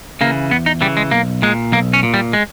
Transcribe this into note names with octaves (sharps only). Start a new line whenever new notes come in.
C#3 E3 A#3
E2 B3
D#4
C#3 E3 G3
G#3
B1 A#3
A#2 G#3
B1 A#3
C#4
A#2
G3
G#3